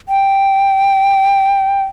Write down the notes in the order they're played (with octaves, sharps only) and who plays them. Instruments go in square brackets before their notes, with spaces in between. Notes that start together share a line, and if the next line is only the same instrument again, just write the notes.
[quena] G5